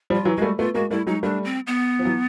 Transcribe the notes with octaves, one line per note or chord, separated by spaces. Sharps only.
F3 G3
F4
E3 F#3
G3 G#3 A3 F#4
A3 B3 F4
G#3 A#3 F#4
G3 A3 E4
F#3 G#3 D#4
G3 A3 D4
C4
B3
F3
E3 F#3